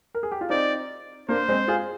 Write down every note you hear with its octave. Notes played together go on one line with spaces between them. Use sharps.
A#4
G#4
G4
F4
C4 D#4 D5
A#3 D4 C5
G#3 C4
F4 G#4